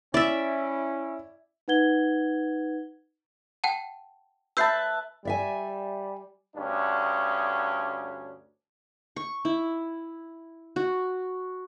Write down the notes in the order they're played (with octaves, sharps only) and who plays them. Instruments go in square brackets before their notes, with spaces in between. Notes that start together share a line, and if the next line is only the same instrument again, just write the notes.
[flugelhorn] C#4 [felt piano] E4 [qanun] D5 E5
[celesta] D#4 B4 F#5 G#6 G7
[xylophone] F#5 G5 A5
[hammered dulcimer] B4 E5 A5 [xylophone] E6 G6 C7
[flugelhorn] G3 [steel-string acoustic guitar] D5 E5 G#5
[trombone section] D2 G2 C#4 D4
[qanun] C#6
E4
F#4